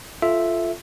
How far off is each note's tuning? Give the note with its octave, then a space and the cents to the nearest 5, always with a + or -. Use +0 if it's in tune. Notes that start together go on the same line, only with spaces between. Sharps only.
F4 -10 A4 -10 E5 +0